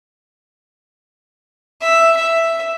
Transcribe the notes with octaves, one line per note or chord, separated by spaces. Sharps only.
E5
E5